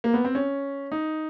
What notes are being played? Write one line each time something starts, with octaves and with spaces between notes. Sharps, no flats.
A#3
B3
C4
C#4
D#4